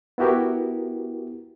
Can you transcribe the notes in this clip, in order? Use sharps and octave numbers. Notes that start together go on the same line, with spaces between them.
B3 E4 F#4 G4 A#4